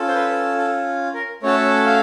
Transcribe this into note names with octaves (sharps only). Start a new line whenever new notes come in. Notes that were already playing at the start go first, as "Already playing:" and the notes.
Already playing: C#4 F4 A4
C5
B4
A4
A#4
A3 C#4 F#4 A4 C#5
F5